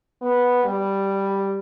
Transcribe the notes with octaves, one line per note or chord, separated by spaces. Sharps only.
B3
G3